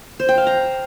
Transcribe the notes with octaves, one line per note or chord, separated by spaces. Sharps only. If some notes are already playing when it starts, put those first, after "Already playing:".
C5
G5
F5
A#5